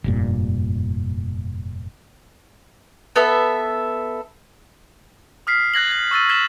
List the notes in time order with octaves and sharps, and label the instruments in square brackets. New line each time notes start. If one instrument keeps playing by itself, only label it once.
[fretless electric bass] F1 G2 A#2
[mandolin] B3 A4 E5
[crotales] D#6 F6 B6 C7
F#6 G#6 A#6 F#7
G#6
C#6 E6 A6 D#7
G#6 B6 E7 G7